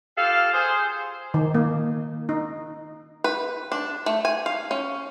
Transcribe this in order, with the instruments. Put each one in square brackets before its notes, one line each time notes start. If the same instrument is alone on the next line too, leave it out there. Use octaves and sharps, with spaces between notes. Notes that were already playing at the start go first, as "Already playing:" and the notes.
[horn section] F4 G4 A4 F5
G#4 C5
[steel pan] D#3
A#3
D#4
[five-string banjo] B4
D4
A3
G#5
F5
C#4